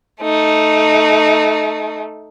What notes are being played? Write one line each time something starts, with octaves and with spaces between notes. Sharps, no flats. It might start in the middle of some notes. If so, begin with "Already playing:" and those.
A3 D#4